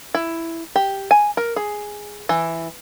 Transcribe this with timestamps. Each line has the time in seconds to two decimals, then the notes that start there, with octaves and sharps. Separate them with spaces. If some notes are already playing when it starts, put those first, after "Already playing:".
0.15 E4
0.76 G4
1.11 G#5
1.37 A#4
1.56 G#4
2.29 E3